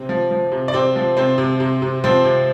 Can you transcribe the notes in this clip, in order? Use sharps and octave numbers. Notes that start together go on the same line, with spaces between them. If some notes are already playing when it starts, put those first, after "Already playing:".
Already playing: C3 C4
F3
F3
C3
D5
C3 C4 C5
F3
C3 C4 C5
C3
C3
C3
F3 C4 C5
C3